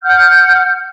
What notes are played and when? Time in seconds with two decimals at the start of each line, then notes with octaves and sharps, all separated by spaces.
0.03 F#5 F6 G6